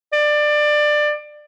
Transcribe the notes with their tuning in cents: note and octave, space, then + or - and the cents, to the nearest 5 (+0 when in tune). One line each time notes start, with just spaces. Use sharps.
D5 +20